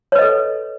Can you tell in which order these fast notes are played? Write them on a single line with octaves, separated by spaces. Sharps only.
C#5 B4 D#5 A4